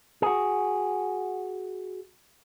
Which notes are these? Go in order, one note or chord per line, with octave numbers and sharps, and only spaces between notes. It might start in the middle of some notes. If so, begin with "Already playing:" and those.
F#4 G#4